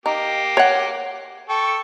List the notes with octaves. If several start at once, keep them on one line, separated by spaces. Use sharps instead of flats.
A#3 D#4 G4
C#5 F#5
A4 G5 C#6